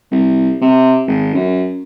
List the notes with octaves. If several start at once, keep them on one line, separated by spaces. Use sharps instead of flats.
C2
C3
G#1
F#2